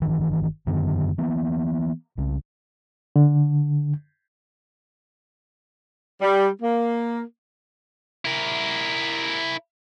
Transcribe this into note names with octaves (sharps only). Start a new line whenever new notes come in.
G1 D#3 E3
F#2 D3 D#3 B3
E3 A#3 B3
C2 C#3
D3
G3
A#3
E4 A#4